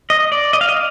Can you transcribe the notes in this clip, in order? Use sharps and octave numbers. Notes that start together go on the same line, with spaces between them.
D#5
D5
D#5
F5
D#5